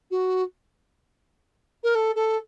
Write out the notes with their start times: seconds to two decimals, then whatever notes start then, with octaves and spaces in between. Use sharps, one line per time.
0.11 F#4
1.83 A#4
1.95 A4
2.15 A4